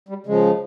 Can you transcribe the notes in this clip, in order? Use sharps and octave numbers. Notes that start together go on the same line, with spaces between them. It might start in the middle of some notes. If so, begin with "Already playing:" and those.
G3
C#3 F3 G#3